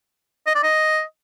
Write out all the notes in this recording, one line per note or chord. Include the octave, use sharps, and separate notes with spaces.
D#5
D5
D#5